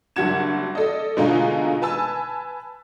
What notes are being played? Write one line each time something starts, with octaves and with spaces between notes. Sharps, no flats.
F#1 G2 F#4 F#5 G#6 E7
A4 D5 D#5
B2 D3 G#3 A3 D#4 F4
B4 G#5 A5 E6